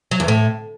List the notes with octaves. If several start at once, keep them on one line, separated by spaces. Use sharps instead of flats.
F#3
E2
A2